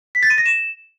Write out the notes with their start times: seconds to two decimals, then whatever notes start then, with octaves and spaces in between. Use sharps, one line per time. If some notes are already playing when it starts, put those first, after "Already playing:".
0.15 B6
0.23 A6
0.30 D#7
0.38 A#6
0.46 E7